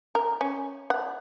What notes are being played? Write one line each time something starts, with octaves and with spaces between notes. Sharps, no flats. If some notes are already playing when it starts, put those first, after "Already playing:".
A#4
C#4
F#5